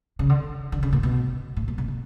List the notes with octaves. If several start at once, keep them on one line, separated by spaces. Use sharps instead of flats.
C#3
D3
D3
C#3
A#2
B2
A2
A#2
B2
B2